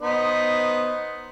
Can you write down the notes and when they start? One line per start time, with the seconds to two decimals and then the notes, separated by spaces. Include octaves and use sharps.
0.01 B3 D#4 C5